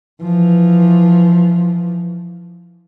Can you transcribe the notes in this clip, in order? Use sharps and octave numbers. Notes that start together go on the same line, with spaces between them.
E3 F3